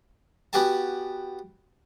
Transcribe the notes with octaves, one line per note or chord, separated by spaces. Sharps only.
B3 F#4 G4 G#5 A5